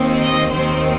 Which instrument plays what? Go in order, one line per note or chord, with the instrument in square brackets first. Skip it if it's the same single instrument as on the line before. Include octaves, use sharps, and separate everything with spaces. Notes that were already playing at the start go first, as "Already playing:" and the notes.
Already playing: [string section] D#2 D#3 C4
D#5
D#2 D#3 C4 C5